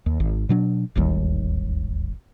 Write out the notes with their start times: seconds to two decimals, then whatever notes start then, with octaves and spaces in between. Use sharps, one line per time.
0.06 D#2
0.20 G#1
0.49 B2 F#3 D4
0.95 D1 G#1 D#2 G3